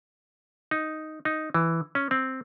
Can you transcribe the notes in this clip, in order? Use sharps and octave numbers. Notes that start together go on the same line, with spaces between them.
D#4
D#4
E3
C#4
C4